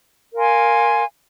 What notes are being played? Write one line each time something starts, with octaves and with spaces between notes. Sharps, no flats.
A#4 F5 G#5 C6